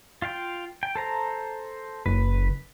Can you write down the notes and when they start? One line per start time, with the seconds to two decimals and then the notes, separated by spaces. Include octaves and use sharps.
0.22 F4 F5 G5
0.83 G5
0.96 A4 C5 A#5
2.06 F#1 B4